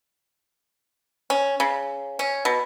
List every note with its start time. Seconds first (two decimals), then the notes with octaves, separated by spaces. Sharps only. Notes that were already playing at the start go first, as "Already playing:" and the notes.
1.30 C#4
1.60 C#3
2.19 C#4
2.45 B2